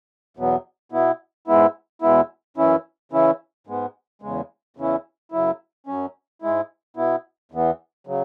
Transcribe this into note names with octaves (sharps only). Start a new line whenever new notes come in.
E2 B2 F#3 B3
B2 B3 E4
G#2 G#3 B3 E4
E2 B2 G#3 B3 E4
F#2 E3 C#4 E4
C#3 E3 C#4 E4
G#2 G#3 B3
E2 C#3 G#3
E2 C#3 E3 C#4 E4
F#2 C#3 F#3 E4
F#2 F#3 C#4
G#2 G#3 E4
B2 B3 E4
E2 E3 B3
C#3 F#3